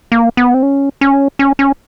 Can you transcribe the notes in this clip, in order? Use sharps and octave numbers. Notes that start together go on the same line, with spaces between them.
A#3
B3
C4
C#4
C#4
C#4
C#4